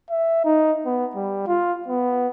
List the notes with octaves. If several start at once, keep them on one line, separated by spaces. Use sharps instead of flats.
E5
D#4
B3
G3
F4
B3